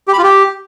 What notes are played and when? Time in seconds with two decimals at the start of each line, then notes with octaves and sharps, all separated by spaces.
0.08 G4
0.13 B5
0.18 F4
0.23 G4